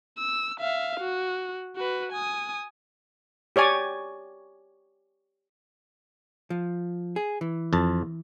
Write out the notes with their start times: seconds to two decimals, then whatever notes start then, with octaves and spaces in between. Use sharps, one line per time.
0.19 E6
0.60 E5 F5
1.00 F#4
1.76 F#4 B4
2.12 G#5 D#6
3.56 G4 C#5 D5 G#5
6.50 F3
7.16 G#4
7.41 E3
7.73 F2 A5